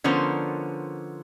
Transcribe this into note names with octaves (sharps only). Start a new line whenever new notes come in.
D3 F3 B3 C#4 A#4 C5